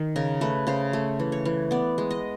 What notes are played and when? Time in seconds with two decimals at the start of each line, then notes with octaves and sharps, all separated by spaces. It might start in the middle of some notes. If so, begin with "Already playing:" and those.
Already playing: D#3
0.16 C#3 A#4
0.41 A3 B4
0.67 C#3 C5
0.93 A3
1.19 E3
1.32 C#5
1.45 E3
1.71 B3 D5
1.98 G#3
2.11 D#5